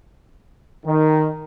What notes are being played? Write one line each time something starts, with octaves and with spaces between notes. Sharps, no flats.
D#3